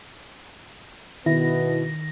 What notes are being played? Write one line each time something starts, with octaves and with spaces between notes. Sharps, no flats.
B2 D#3 B3 E4 A#6